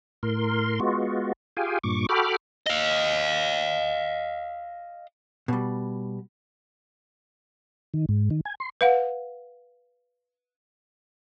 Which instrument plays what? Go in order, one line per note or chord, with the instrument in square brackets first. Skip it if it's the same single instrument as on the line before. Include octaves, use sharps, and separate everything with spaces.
[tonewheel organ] A2 A#4 C6
G#3 B3 F4 F#4
F4 G4 G#4 F5 G5 G#5
G2 A#2 C#6 D6
F#4 A4 G5 B5 D6 F6
[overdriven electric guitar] D#5 F5
[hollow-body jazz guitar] B2 G3
[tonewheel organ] D#3
G#2
D#3
G#5
C6
[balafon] B4 F5 F#5